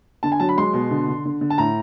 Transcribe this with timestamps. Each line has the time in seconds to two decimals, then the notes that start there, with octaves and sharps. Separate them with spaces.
0.23 D3 A5
0.32 G#5
0.40 F#3 A5
0.49 B5
0.57 G#3 C6
0.73 B2
0.91 D3
1.08 D3
1.25 D3
1.41 D3
1.50 A5
1.58 A2 A#5